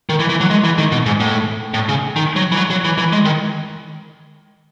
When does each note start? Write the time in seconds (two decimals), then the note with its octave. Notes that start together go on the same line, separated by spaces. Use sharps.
0.09 D#3
0.20 E3
0.30 E3
0.41 F#3
0.51 G#3
0.64 E3
0.78 D#3
0.92 B2
1.06 G#2
1.20 A2
1.74 A2
1.89 C#3
2.16 D#3
2.36 F#3
2.52 E3
2.57 F#3
2.71 F#3
2.84 E3
2.98 E3
3.13 G#3
3.25 D#3